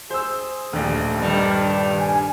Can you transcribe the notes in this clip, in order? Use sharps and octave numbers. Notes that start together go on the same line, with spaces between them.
G#4 C5 E6
D#1 A#1 D#2 A3
G2 D#3 G3 D4
G#5